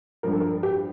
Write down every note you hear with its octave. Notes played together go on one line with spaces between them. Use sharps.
G2 F3 A#4
A4
A#4
G4